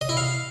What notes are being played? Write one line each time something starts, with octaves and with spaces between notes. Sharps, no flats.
D#5
E4
F5